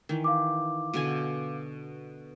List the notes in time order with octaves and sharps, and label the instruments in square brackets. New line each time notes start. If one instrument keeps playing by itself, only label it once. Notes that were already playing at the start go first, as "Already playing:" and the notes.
[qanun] D#3 E3
[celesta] F5 D6
[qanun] B2 D3 G#5